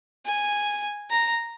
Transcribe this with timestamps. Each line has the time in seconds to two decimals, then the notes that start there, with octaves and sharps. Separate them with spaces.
0.26 G#5
1.10 A#5